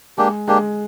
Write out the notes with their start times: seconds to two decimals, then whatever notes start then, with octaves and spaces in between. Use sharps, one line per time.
0.18 G#3 A#3 D4 G4
0.48 G#3 A#3 D4 G4